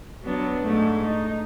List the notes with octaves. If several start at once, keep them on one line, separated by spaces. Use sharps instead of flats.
F#3 B3 D4
G#2 A3
D#4